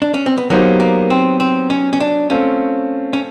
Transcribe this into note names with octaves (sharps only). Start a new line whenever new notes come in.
D4
C#4
C4
B3
F#3 A#3 B3 D#4 G4 C5
A#3
C4
C4
C#4
C#4
D4
A3 C4 C#4 F4
C#4